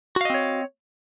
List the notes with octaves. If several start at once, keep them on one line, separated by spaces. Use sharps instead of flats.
C4 F#4 C#5 D#5 F5